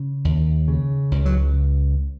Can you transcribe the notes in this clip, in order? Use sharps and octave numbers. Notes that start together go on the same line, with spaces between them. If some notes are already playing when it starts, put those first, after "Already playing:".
Already playing: C#3
D#2
C#3
C#2
F#3